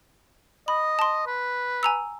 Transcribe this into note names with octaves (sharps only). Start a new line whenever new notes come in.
D#5 B5
A5 C6
B4
G#5 A#5 E6